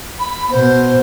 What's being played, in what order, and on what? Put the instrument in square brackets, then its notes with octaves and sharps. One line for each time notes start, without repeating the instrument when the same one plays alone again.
[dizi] B5
[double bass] B2 [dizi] C5